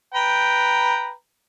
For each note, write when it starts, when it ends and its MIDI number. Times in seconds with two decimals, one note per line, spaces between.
0.14 1.12 71
0.14 1.12 79
0.14 1.12 82